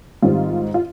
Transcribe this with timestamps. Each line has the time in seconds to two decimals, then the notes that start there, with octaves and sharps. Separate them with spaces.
0.22 G#2 D#3 G3 C4 F4
0.74 F4